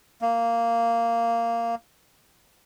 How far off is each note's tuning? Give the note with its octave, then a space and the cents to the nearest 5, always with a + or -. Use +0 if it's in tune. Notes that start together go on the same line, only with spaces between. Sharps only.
A#3 -10